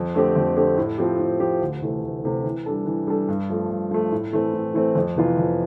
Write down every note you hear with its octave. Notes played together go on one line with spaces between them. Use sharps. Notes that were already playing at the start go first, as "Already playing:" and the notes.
Already playing: F2
D3 A3 C4 G4
F2
D3 A3 C4 G4
A2
F3 C4 G4
A2
F3 C4 G4
D2
C3 E3 A3
D2
C3 E3 A3
E3
G3 D4 A4
E3
G3 D4 A4
G2
F3 A3
G2
F3 A3
A2
E3 A3 C4
A2
E3 A3 C4
F2
C3 E3 B3 F4
F2